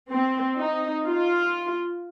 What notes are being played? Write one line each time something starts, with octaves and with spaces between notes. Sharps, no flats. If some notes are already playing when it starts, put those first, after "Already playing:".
C4
D#4
F4